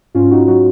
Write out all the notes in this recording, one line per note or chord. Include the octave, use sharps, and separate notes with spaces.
G#2 C#4 F4
D#4 F#4
F#3 D#4 F#4